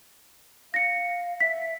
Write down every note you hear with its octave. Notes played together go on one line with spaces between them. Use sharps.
F5 A#6 C#7
E5 B6